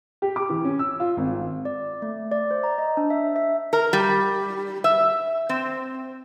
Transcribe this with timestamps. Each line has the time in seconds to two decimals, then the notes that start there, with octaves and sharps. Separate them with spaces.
0.22 G4
0.36 D6
0.50 E3
0.65 C#4
0.79 E6
1.00 F4
1.17 G#1
1.65 D5
2.02 A3
2.32 D5
2.51 C5
2.64 A#5
2.78 D#5
2.97 D4
3.10 E5
3.36 E5
3.73 A#4
3.93 G3
4.84 E5
5.49 C4